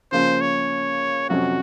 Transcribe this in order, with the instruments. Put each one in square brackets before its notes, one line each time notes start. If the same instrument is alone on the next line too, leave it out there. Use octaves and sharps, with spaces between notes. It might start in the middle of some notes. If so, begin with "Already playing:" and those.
[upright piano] C#3 F3 A#3 C#4 [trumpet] C5
[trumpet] C#5
[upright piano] F2 C3 F#3 C#4 [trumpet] F#4